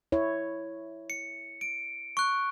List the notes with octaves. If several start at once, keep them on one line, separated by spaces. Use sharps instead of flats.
E4 C#5
C#7
D7
C#6 F#6